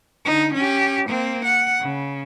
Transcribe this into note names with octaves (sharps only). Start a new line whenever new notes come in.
D3 D#4
C#4 G4
A#3 C4
F#5
C#3